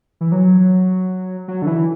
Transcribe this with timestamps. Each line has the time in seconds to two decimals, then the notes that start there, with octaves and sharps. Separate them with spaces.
0.21 E3
0.32 F#3
1.48 F#3
1.62 D3
1.67 E3